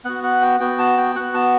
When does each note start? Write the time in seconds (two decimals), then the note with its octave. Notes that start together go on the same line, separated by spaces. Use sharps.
0.05 B3 F#4 F#5
0.23 F#5
0.42 G5
0.60 B3 F#4 G5
0.79 A5
0.97 G5
1.15 B3 F#4 F#5
1.34 A5